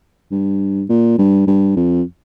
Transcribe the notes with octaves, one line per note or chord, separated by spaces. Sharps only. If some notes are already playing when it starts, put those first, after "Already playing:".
G2
A#2
G2
G2
F2